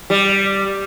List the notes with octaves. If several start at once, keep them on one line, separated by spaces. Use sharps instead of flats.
G3